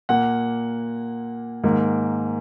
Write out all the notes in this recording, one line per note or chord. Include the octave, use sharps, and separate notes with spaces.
A#2 A#3 F#5
G#2 D#3 A#3